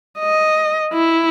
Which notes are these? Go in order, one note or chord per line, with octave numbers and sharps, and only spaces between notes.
D#5
E4